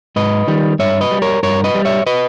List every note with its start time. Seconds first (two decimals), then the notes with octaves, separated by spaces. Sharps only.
0.16 G#2 B4 D#5
0.48 D#3 G3
0.79 G2 C#5 E5
1.01 B4 D#5
1.11 G3
1.22 A#4 C#5
1.43 G2 A#4 C#5
1.64 B4 D#5
1.75 G3
1.85 C#5 E5
2.07 B4 D#5